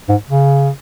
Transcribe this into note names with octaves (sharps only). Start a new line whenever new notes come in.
G#2
C#3